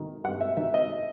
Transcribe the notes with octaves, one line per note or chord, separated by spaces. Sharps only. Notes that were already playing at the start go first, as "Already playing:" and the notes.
Already playing: D#3
G2 F#5
E5
D#3 E5
D#5